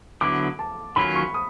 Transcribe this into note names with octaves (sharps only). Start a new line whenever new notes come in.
D3 F#3 B3 E4 D6
A5
D#3 F#3 A#3 C#4 F4 B5
C#6
D#6